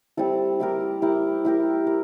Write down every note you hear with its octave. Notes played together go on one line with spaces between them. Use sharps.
G3 C4 E4 A4
E4 G4 A#4
E4 G4 A#4
E4 G4 A#4
A#4